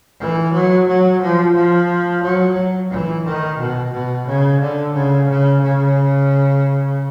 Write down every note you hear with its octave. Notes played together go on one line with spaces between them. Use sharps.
E3
F#3
F#3
F3
F3
F#3
E3
D#3
B2
B2
C#3
D3
C#3
C#3
C#3